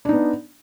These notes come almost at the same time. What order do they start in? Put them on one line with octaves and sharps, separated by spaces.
D4 D#4 B3